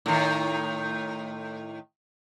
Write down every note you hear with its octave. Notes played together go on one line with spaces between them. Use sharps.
A2 D#3